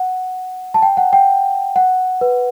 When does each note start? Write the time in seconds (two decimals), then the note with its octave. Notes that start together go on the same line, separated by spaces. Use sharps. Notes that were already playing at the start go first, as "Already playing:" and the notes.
Already playing: F#5
0.74 A5
0.82 G5
0.97 F#5
1.13 G5
1.76 F#5
2.21 B4